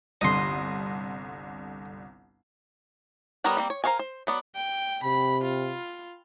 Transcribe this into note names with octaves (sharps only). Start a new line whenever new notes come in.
G1 C2 D3 D#5 C6
G3 B3 A#4 C#5 F#5
G3 A#3 C4
C#5
A#4 C5 C#5 F5 G#5
C5
F#3 B3 D5
G5
C3 B5
F4